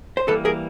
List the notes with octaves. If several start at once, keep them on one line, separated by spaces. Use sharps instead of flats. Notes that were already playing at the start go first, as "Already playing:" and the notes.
C5
E3 G3 A#3 A4 B4
G#4 A#4